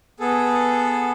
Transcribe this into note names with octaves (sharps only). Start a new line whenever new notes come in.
B3 G#4 A4